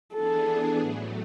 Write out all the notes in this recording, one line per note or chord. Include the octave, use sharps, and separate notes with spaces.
E3 B3 D4 G#4 A4
A2 F#3 A3